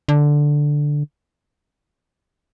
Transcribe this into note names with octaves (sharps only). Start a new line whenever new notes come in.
D3